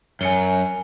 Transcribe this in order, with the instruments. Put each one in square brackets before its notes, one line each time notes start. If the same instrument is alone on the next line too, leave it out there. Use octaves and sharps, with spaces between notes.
[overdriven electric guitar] F#2 [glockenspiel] G#5 C#7 G7